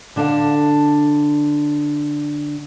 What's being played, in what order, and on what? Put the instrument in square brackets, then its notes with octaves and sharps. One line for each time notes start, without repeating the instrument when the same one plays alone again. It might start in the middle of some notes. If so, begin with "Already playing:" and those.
[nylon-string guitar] D3 D4 A4 F5